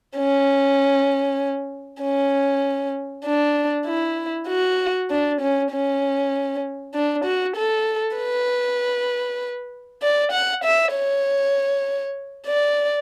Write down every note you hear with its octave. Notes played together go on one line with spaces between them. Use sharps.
C#4
C#4
D4
E4
F#4
D4
C#4
C#4
D4
F#4
A4
B4
D5
F#5
E5
C#5
D5